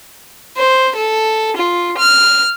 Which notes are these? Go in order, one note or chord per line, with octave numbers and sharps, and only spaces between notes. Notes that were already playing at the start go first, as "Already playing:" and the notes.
C5
A4
F4
F6